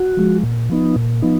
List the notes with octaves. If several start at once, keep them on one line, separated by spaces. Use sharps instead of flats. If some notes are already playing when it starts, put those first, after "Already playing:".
Already playing: F#4
F3 G#3
A#2
F3 B3 D#4
A#2
F3 B3 D#4